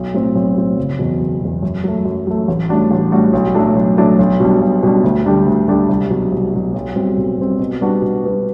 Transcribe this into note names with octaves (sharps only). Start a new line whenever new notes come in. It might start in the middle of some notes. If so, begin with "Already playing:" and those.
Already playing: B1
A2 F#3 C4
B1
A2 F#3 C4
F#1
E2 B2
F#1
E2 B2
F#2
F#3 A3
F#2
F#3 A3
A1
A2 G3 D4 F#4
A1
A2 G3 D4 F#4
B1
A2 F#3 A3 D4
B1
A2 F#3 A3 D4
B1
B2 G3 D4
B1
B2 G3 D4
D2
D3 G3 D4 G4
D2
D3 G3 D4 G4
C2
B2 F#3
C2
B2 F#3
B1
B2 G3 C4
B1
B2 G3 C4
B2
G3 B3 D4 F#4
B2
G3 B3 D4 F#4